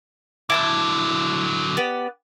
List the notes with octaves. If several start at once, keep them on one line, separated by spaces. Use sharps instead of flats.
D3 F#3 E4 A5 G6
B3 G4 D5